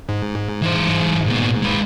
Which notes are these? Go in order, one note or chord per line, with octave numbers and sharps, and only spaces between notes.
G#2
E3 C5
A#2 B3
G#3 B4